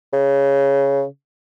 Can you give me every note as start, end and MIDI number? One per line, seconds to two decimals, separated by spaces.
0.13 1.05 49